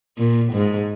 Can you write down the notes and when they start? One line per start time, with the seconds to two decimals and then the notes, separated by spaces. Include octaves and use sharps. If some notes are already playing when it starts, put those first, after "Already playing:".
0.18 A#2
0.53 G#2